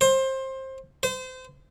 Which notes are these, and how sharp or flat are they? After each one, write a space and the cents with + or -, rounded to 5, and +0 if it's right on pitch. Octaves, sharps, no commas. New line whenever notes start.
C5 +20
C5 -30